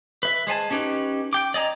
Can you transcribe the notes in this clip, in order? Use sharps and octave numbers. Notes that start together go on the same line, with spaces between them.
B4 E5
G#3 C5 G#5 A5
C#4 D#4 G4 B4
G5 D6
D5 D#5 G#5 A#5